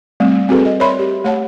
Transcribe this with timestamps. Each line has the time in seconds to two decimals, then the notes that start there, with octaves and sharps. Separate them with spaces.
0.20 G3 A3 C4
0.49 C4 F#4 G#4 A4 B4
0.65 D#5
0.80 A#4 C#5 D5 E5 B5 C6
0.99 G4
1.24 A3 C#5 F#5 A5